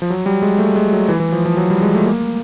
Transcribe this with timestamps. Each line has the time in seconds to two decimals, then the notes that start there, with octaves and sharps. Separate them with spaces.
0.02 F3
0.10 F#3
0.26 G3
0.42 G#3
0.59 A3
0.76 G#3
0.92 F#3
1.09 E3
1.20 E3
1.32 F3
1.46 F3
1.57 F#3
1.70 G3
1.82 G#3
1.95 A3
2.06 A#3